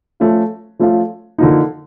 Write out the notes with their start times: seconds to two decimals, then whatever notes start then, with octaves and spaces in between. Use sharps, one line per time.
0.20 F3 A3 C#4 F4
0.79 F3 A3 C#4 F4
1.38 D3 F3 A#3 D#4